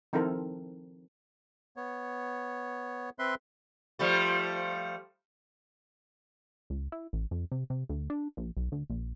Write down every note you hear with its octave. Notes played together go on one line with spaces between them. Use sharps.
D#3 F3 C4 E4 A4 A#4
B3 C#5
C4 B4 E5 C6
F3 G3 A3
C#2
E4
A1
F2
C3
C3
D2
D4
A#1
B1
D2
A#1